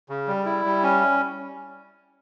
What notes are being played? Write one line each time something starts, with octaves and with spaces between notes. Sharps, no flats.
C#3
G3
E4
G3
C#4